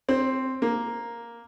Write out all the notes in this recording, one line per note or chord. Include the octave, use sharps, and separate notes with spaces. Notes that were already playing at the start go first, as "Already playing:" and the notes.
C4
A#3